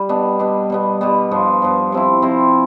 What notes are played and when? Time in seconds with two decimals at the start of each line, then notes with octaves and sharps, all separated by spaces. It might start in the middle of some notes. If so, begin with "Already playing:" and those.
Already playing: G3
0.09 B2 B3 D4
0.39 B2 B3 D4
0.70 B2 G3 B3
1.01 B2 G3 B3
1.31 G2 F3 B3
1.62 G2 F3 B3
1.92 C3 F3 C4 E4
2.22 C3 F3 C4 E4